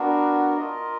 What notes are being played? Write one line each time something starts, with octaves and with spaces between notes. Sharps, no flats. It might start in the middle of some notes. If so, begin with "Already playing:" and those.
Already playing: B3 D4 F#4 A#4
F4 A#4 D#5